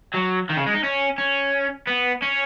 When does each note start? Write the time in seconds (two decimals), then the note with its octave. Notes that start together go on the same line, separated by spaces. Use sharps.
0.14 F#3
0.49 D#3
0.57 C#3
0.66 G#3
0.74 D#4
0.83 C#4
1.18 C#4
1.87 B3
2.22 C#4